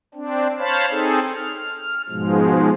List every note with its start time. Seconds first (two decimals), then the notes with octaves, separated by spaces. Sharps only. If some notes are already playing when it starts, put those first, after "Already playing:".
0.14 C4 D4
0.58 C5 C#5 F5 A5 B5
0.90 C4 D#4 G#4 A4
1.35 F6
2.09 G#2 B2 F3 G#3